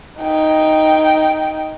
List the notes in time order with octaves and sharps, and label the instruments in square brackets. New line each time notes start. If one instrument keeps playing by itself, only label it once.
[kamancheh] D#4 G5